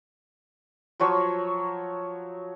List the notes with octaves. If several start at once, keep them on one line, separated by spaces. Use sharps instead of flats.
F3 F#3 C#5 C#6